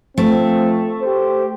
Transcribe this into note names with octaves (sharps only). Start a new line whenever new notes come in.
F3 A3 C4
G4 C5